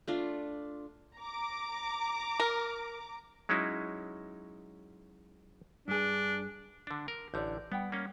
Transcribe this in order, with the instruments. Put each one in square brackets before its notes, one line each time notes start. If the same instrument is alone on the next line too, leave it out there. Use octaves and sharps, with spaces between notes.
[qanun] A3 D4 F4
[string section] A#5 D6
[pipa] A#4
[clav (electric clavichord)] F#3 G#3 C#4 D#4 E4
[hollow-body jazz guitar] G2 G#4 [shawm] D4
[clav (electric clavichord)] D3 D4
A#4
[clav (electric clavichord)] A1 D3 [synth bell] D5 G6
[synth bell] G3 F#5 G5 [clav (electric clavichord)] B3
[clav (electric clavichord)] A#3 C#4